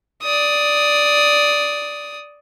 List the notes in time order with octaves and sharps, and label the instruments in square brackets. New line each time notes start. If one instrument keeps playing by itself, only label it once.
[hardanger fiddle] D5 D#6